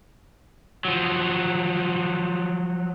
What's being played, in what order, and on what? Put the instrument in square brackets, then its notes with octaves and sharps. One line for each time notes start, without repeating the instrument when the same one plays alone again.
[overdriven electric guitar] F3 F#3